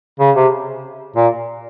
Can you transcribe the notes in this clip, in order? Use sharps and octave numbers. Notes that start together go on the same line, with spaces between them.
C#3
C3
A#2